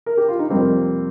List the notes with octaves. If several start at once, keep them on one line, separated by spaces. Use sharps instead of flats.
A#4
G4
F4
D#4
F2 C3 G3 A#3 C4